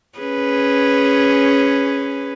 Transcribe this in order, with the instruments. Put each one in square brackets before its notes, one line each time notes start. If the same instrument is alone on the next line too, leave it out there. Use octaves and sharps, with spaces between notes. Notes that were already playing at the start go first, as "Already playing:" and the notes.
[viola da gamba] C#4 G#4 B4